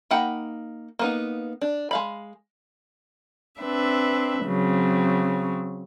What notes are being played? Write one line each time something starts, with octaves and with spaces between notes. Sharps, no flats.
A#3 D#4 F#5 G5 B5
A#3 B3 D#4
D4
G#3 F5 B5
C4 D4 B4 E5
C#3 F#3 C4